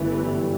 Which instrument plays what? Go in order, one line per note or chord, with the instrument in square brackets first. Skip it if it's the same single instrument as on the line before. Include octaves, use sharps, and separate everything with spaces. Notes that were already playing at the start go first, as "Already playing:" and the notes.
Already playing: [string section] G1 F#2 E3 A3
[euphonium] G3